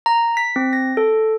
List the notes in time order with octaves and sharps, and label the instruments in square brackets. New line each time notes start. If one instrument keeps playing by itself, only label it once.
[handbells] A#5
B6
C4
A#6
A4